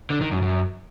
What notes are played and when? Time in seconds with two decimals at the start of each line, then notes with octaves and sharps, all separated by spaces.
0.10 D3
0.21 D#3
0.31 F#2
0.42 F#2